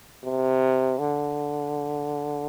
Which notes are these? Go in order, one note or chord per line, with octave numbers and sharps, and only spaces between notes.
C3
D3